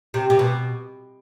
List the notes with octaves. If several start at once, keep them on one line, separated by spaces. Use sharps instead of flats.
C3
C3
B2